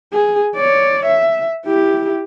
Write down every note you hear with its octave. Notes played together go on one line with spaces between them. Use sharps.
G#4
C#5 D5
E5
E4 G4